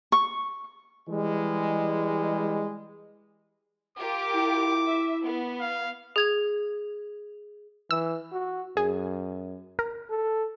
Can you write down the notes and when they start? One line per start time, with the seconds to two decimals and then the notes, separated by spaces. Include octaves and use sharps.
0.12 C#6
1.09 E3 G3 G#3
3.98 F4 G4 A#4 D6
4.34 E4
4.86 E5
5.23 B3
5.61 F5
6.16 G#4 G#6 F7
7.91 E3 E6
8.32 F#4
8.77 F#2 G#4
9.79 A#4
10.10 A4